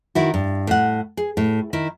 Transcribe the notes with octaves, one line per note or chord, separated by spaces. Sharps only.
D#3 E4 F#4
G2
A2 F#5
G#4
A2
D#3 E4